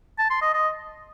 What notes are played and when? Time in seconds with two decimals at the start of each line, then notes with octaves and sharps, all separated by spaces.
0.19 A5
0.30 C6
0.42 D#5
0.54 D#5